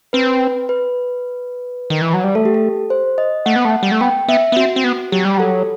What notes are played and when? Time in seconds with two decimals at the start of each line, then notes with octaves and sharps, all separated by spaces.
0.13 C4 B4
0.69 B4
1.90 D#3
2.01 E3
2.14 F#3
2.24 G3
2.35 A3 A4
2.45 G4
2.54 A4
2.90 C5
3.18 D#5
3.46 A3 F#5
3.56 B3
3.65 A3
3.83 G3
3.92 A3
4.01 B3 G5
4.28 B3 E5
4.52 B3
4.56 C4 F#4
4.76 C4
4.84 B3
5.12 F#3 G4
5.25 G3
5.37 F#3 A4